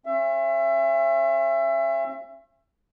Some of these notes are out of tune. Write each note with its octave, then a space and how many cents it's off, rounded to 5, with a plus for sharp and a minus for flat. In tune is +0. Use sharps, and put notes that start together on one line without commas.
C#4 -45 E5 +30